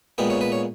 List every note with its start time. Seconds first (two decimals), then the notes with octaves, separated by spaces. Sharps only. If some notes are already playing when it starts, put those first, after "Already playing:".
0.18 A#2 G#3 B3 G4
0.30 C#5
0.41 B4
0.52 C#5